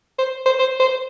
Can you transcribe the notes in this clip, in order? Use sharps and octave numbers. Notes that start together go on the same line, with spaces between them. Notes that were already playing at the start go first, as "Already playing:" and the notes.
C5
C5
C5
C5